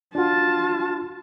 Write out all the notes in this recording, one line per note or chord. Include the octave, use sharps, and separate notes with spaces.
D4 F4 F#4 A5